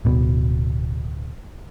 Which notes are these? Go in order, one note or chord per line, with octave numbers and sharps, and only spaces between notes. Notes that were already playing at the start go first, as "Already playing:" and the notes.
D1 B2